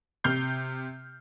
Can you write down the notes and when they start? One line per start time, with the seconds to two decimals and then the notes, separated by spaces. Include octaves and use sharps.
0.24 C3 F6 G6 C7